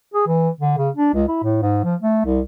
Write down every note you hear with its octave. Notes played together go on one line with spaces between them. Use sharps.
G#4
E3
D3
C#3
D4
C#2
E4
A2
G#2
F3
A3
C2